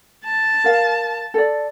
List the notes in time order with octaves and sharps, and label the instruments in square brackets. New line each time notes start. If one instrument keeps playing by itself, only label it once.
[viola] A5
[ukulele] A#4 F5
A4 D5